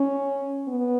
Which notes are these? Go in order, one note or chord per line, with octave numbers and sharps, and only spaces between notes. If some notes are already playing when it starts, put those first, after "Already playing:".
Already playing: C#4
B3